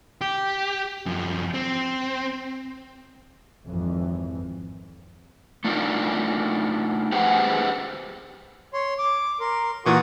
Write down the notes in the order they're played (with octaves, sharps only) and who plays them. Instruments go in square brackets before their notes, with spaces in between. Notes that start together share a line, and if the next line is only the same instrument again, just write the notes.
[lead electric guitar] G4
F#2 F3
C4
[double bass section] G#1 F2 E3
[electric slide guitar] A3 D4 D#4 F4 A#4
G4 G#4 B4 C5 F#5
[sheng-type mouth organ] C#5 C6
D6
A#4 C6
[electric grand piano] A#2 E3 C#6 [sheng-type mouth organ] F#4 A#4 D#6